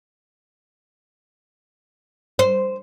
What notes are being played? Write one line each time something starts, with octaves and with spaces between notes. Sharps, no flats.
C5